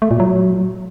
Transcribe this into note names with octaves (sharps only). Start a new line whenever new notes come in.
A3
A#2
F#3